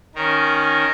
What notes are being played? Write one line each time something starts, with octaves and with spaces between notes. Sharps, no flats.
D#3 C#4 A#4